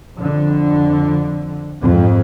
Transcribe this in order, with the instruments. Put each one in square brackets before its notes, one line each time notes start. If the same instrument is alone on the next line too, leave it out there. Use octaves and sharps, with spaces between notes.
[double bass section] F2 D3
F2 G#2